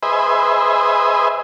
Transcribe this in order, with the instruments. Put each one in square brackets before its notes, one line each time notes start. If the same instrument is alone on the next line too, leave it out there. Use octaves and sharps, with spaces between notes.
[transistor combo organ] G#4 B4 C5 D#5 E5